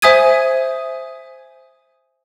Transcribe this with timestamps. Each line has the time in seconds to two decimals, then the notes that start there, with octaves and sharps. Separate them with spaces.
0.02 C5 E5 G#5 D#6 G#6 D#7